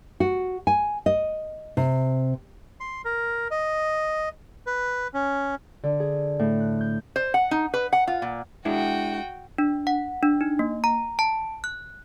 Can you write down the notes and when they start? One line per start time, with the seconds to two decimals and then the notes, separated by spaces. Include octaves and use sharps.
0.20 F#4
0.67 G#5
1.06 D#5
1.77 C3
2.80 C6
3.05 A#4
3.51 D#5
4.66 B4
5.14 C#4
5.84 D3
6.00 G#4
6.39 A2
6.60 F#6
6.81 G6
7.16 C5
7.34 F#5
7.51 D#4
7.74 B4
7.93 F#5
8.08 F4
8.22 A#2
8.65 G#3 D4 E4 F#4 G5
9.58 D4
9.87 F#5
10.23 D4
10.41 D#4
10.59 A#3
10.84 A#5
11.19 A5
11.64 F#6